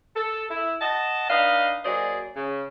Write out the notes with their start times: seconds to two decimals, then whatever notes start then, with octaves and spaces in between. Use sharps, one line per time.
0.16 A4
0.50 E4
0.81 D#5 F#5 A5
1.29 D4 D#4 B4 D#5 F5
1.85 F#3 A#3 G#4 C5 D5 D#5
2.36 C#3